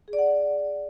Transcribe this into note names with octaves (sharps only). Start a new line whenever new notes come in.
G#4
D5
F#5